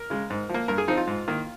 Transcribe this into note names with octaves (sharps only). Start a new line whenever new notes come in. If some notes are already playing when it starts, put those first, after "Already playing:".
Already playing: A#4
C#3 G#3
G#2
F3
A#3
G2 A#4
G#4
F3 C4 D#4
F4
G#2
D#3 A#3